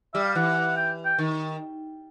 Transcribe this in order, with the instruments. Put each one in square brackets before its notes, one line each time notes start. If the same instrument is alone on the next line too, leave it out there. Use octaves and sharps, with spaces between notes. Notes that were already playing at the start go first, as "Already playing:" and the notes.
[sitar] G3 [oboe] E5
[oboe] F5
[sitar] E3 [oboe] F#5
[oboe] G5
G5
[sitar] D#3